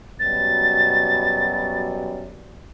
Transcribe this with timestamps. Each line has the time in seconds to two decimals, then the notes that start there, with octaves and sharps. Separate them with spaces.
0.19 F#2 B2 G3 A6